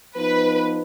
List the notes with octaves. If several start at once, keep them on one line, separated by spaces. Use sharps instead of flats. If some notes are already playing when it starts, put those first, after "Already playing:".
F3 B3 D#4 B4